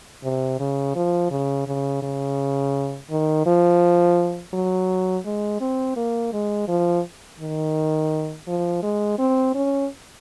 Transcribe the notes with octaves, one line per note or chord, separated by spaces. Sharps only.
C3
C#3
F3
C#3
C#3
C#3
D#3
F3
F#3
G#3
C4
A#3
G#3
F3
D#3
F3
G#3
C4
C#4